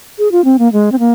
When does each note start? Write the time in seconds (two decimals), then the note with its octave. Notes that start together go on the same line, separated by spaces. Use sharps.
0.18 G#4
0.32 F4
0.44 C4
0.59 A#3
0.72 G#3
0.92 C4
0.99 A#3